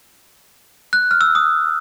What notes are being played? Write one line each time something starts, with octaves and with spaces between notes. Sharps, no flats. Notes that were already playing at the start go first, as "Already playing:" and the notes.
F#6
F6
E6
D#6